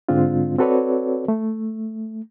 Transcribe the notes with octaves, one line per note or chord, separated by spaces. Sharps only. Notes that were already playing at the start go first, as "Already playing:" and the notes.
G#2 D3 G#3 C4 D4 F4
C4 F#4 A4 B4 C#5 D5
A3